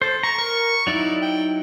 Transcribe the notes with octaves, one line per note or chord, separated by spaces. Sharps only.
A4 C5
A#5 C#6
A#4 C#6
F#3 D#4 E4 D5
G5